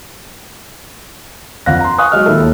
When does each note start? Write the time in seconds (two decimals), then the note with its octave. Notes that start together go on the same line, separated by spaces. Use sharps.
1.66 F2 D3 F3 F5 F#6 A#6
1.81 A#5 C6
1.98 F5 G#5 C#6 D#6 F#6
2.12 F#3 G#3 D#5 F6
2.26 A#2 D#3 E4 A4
2.40 D#2